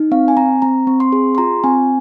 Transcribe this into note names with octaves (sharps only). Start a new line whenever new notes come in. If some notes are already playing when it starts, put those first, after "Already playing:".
Already playing: D#4
C4 F5
G#5
C4 A#5
C4 A#5
C4
C6
G#4
C6
F4 A#5
C4 G#5